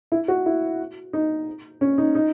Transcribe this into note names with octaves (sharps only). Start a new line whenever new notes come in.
E4
F#4
E4
D#4
C#4
D#4
D#4